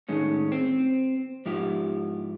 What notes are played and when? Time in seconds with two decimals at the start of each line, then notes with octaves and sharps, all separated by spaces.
0.09 A2 D#3 G#3 C#4
0.52 C4
1.46 G#2 F3 E4 G4